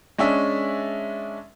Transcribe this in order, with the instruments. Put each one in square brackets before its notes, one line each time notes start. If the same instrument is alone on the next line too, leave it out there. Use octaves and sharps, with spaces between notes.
[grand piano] G#3 C#4 D4 E5